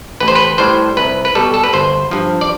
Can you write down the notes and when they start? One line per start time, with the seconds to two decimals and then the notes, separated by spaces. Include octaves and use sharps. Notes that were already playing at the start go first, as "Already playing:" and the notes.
0.20 A1 B4
0.28 C5
0.35 B4
0.58 A2 G3 C5
0.97 C2 B4
1.25 B4
1.35 B2 G3 A4
1.54 A4
1.64 B4
1.73 G1 C5
2.11 G2 F3
2.41 D5